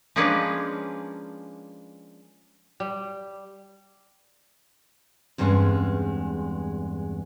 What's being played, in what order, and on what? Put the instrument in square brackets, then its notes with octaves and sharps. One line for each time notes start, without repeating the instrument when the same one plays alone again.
[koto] F3 G#3 A#3 C#4 D4 B4
[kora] G3
[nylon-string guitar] E2 G2 G#3 C4 C#4